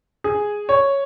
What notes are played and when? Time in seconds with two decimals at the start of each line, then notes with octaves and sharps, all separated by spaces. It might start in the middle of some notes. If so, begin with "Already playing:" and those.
0.24 G#4
0.69 C#5